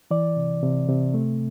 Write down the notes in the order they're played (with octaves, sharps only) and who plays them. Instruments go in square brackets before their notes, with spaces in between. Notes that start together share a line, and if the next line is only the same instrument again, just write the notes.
[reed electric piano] E3 D5
C3
C3
C3
A3